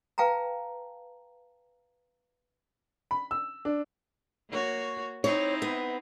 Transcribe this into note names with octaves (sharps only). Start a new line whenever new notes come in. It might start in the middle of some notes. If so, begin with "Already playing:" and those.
B4 F5 G5 A5 A#5
B5
E6
D4
A#3 F#4 C#5
C4 D#4 E4 C#5
B3